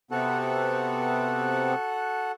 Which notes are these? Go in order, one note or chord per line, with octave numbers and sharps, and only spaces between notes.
C3 B3 C4 F#4 A4 F#5